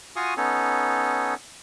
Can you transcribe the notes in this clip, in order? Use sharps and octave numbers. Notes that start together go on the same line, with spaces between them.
F4 F#4 F5 G#5 C#6 D#6
B3 C#4 D#4 A4 C#5